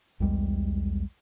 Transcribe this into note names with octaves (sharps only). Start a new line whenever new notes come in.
B1 E2 G3 G#3